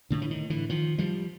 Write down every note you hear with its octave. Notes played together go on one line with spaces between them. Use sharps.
A2 D3
E3
D#3
D3 E3
D#3 F3
F3 G3